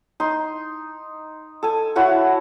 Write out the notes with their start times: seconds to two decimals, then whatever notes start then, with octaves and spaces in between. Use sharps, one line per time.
0.20 D#4 C6
1.63 A4 G#5
1.96 E4 F#4 C#5 F#5